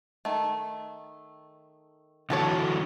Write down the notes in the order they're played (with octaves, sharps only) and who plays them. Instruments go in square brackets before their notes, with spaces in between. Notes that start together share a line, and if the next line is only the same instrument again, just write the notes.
[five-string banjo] D#3 A3
[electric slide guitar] D3 E3 F#4 [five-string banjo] G4 A4 C#5